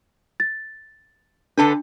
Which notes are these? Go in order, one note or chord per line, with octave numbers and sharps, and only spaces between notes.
A6
D3 D4 A4 B4